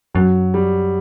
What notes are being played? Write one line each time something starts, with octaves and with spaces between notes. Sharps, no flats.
F#2 F#3
G3